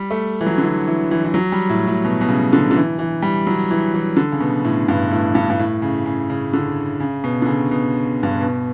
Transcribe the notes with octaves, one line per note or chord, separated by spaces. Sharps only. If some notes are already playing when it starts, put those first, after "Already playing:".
Already playing: G3
A3
E3
F#3
D3
E3
E3
E3
E3
F#3
G3
A2
A2
B2
B2
C#3
D3
D3
E3
E3
G3
F#3
E3
E3
D3
C#3
B2
A2
G2
A2
G2
G2
A2
C#3
C#3
C#3
D3
C#3
B2
D3
C#3
B2
G2
B2